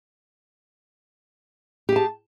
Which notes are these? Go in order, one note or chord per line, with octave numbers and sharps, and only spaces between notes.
G4 G#4 A5